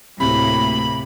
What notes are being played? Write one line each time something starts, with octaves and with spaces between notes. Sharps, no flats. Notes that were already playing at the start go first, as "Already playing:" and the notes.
D2 A2 C3 A#3 B5